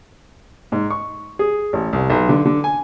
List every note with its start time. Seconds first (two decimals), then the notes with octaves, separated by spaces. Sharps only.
0.72 G#2
0.90 C#6
1.39 G#4
1.73 A1
1.93 C2
2.10 B1
2.29 D3
2.45 D3
2.64 G#5